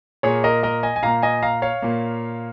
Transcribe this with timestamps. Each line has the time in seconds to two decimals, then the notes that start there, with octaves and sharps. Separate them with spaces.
0.23 A#2 A#3 G#4 C#5
0.44 A#4 D#5
0.63 A#4 D#5
0.83 D#5 G#5
0.96 G#5
1.03 A#2 A#3 F5 A#5
1.23 D#5 G#5
1.42 F5 A#5
1.62 C#5 F5
1.82 A#2 A#3